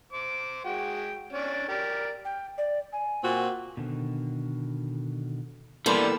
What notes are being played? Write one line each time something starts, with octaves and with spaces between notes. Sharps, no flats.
C5 D6
G#3 F#4 G5
C#4 D4 D5
G4 A#4 D5
G5
D5
G#5
A#2 C4 F#4
B2 D3 D#3
E3 G3 A#3 B3 E4 G4 A4 C6